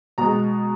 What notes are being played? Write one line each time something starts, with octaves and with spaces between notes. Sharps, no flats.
B2 G#3 A#5